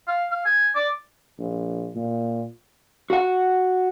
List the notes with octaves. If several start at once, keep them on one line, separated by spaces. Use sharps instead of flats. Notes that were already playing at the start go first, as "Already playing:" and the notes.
F5
F5
G#5
D5
A#1
A#2
F#4 F#5